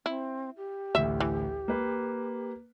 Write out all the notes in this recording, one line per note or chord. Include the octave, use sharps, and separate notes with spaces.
C4 E4
G4
A1 D2 E5
E3
A#3 B4